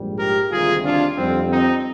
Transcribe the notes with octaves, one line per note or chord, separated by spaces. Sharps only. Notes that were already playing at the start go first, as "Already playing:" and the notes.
Already playing: A#1 G#2 G3
G4 A#4
D2 C3 D#3 G3 F4 G#4
D4 F4
F2 D3 G3 C4
C4 D#4